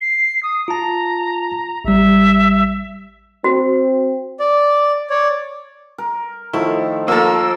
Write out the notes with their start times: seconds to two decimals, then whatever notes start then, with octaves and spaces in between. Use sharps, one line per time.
0.01 C7
0.43 D#6
0.68 F4 A5 A#5
1.85 A1 G3 E5
3.44 C4 F#4
4.40 D5
5.10 C#5 D5
5.98 A#4
6.53 D#3 F3 A3 E4
7.08 F3 A#3 A4 A#4 E6